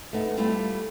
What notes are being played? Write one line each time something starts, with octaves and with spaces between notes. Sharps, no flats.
A3 B3 D#4
G3 A3 E4 F4 G4